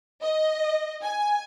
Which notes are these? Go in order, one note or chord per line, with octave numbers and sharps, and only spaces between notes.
D#5
G#5